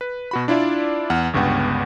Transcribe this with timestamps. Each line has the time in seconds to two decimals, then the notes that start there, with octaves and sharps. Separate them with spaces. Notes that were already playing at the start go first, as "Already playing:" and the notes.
0.01 B4
0.31 B2 F#4 B5
0.48 D4 E4 F4 D5 E5
1.10 E2 F#5 F6
1.33 G1 C#2 G2 B3 F#5 G5